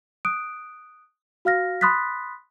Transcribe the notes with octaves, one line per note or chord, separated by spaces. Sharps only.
D#6 F#6 D7
F#4 F5 F6 A#6
B5 C6 D#6 F#6 A6 B6